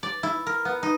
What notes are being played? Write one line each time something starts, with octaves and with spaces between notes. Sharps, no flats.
D5
E4
A#4
B3
D#4